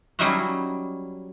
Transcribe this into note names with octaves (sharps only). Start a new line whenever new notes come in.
F#3 G3 C#4 D#4 E4 F#4